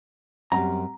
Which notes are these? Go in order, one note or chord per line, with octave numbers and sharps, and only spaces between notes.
F#2 G3 C4 A#5